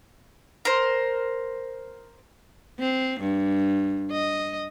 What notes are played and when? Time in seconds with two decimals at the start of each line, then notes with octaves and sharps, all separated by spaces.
0.65 A#4 C5
2.79 C4
3.20 G2
4.12 D#5